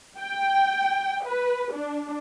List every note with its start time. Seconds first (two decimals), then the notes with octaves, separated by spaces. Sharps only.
0.19 G5
1.25 B4
1.72 D4